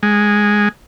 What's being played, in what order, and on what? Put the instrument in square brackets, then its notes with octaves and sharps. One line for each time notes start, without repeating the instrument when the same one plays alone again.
[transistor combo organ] G#3